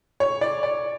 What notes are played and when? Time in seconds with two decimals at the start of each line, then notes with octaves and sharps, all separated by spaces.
0.20 C#5
0.41 D5
0.63 D5